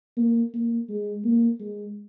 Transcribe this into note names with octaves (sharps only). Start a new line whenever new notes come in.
A#3
A#3
G#3
A#3
G#3